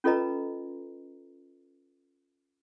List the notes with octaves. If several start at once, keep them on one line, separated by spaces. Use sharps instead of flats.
C#4 F4 A4 B4 D#5 A#5